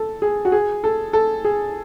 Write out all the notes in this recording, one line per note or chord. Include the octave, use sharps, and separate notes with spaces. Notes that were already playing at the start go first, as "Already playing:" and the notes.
Already playing: A4
G#4
F#4
G#4
A4
A4
G#4